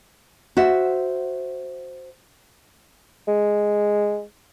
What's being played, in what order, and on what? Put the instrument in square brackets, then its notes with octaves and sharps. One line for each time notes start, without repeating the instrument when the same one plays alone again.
[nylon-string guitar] F#4 C5 E5
[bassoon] G#3